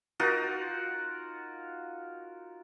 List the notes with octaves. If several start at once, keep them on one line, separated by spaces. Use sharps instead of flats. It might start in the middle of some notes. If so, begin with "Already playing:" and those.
D#4 F4 F#4 A#4